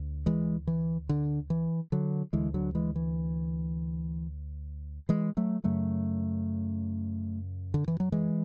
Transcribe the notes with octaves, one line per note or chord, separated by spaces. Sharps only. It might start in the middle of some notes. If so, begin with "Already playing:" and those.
Already playing: D2
E3 G#3
E3
D3
E3
D3 F#3
D2 D3 E3 G#3
D3 F#3
E3 G#3
E3
E3 G#3
F#3 A3
F#2 C#3 F#3 A3
D3
E3
F#3
E3 G#3